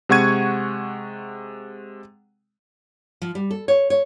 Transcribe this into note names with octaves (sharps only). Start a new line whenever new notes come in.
C3 G#3 F#5 C#6 G#6 D#7
F3
G3
A4
C#5
C#5